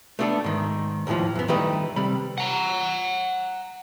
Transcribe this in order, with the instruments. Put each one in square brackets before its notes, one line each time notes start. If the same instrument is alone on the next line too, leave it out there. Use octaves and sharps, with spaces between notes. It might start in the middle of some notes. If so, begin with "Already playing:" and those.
[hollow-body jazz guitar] A3 B3 D4 E4 A4
G#2 D#3
D#2 A2 C3 E3 F3
F#2 B3
D#3 G3 A3 D#4 G4 B4
C3 G3 B5
[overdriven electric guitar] F#5 A#5